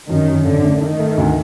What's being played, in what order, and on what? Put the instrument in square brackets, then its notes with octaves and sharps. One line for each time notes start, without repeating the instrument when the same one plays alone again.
[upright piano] F#2 [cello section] D#3
[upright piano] F#2
[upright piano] A1 [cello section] D3
[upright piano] A3
[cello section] D#3 [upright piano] D#4
[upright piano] A3
D2